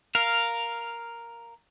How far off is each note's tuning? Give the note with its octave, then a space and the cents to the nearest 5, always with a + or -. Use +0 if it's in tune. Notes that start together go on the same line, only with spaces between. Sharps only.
A#4 +0 F5 +0